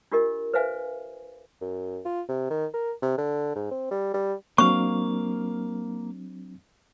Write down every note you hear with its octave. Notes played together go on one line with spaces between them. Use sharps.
D4 F4 G4 A#4 D#5
B4 C5 E5 F5 G#5
F#2
F4
C3
D#3
A#4
C3
D3
G#2
C4
G3
G3
F#3 A#3 C4 D4 F5 C#6